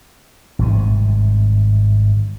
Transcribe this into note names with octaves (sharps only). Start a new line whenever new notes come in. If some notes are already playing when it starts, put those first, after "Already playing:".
G#1 G2 C3